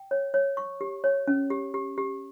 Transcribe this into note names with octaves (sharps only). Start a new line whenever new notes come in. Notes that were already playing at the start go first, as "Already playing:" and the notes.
Already playing: G5
C#5
C#5
C#6
G4
C#5
C#4
G4
G4
G4